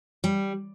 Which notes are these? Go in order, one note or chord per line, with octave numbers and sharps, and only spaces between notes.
G3